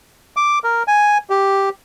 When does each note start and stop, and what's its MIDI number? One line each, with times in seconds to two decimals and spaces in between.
0.37 0.59 86
0.64 0.83 70
0.88 1.18 80
1.30 1.69 67